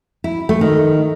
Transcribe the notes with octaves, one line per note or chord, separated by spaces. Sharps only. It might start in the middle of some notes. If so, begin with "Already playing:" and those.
E4
A3
D#3